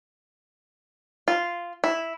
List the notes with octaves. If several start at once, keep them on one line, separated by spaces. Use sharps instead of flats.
F4
E4